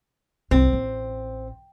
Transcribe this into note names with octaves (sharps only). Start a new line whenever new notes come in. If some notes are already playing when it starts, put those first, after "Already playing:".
C2 F#2 C4
A1